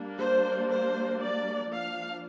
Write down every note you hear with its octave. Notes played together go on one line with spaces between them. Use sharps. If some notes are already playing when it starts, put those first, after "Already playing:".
Already playing: G3 A#3 D4
C5
C5
D5
F3 A#3 D4 F5